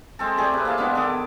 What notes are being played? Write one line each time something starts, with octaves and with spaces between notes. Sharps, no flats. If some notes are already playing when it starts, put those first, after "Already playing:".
G#3 C4 A4
A3 G4 G#4 D5
C3 B4
A#3 E4 F5 A5
G#3 B3 D4 E4
D#3 B3 A4 D6